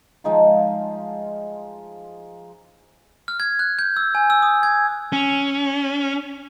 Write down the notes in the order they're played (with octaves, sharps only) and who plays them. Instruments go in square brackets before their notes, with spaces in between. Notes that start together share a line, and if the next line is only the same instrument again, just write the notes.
[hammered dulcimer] F3 G#3 D#4 F4
[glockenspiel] F6
G#6
F#6
G6
E6
G#5
E6
D#6
G#6
[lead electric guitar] C#4